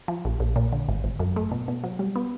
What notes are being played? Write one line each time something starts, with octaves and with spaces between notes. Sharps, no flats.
F3
A#1
A#1
A#2
D3
G#1
G#1
F#2
A3
B2
B2
F#3
G3
B3